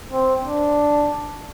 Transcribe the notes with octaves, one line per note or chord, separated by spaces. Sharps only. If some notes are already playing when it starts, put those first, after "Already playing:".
C4
D4